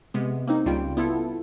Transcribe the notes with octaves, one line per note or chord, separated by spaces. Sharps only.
C3 G#3 B3
A#3 C4 D#4
C#2 C#3 G3 F4 G5
B3 E4 F4 A4